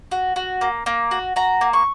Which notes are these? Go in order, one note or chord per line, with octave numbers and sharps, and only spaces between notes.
F#4
F#4
A#3
A#3
F#4
F#4 A#5
A#3
C#6